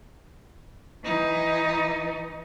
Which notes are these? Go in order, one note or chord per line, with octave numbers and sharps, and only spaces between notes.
E3 D#4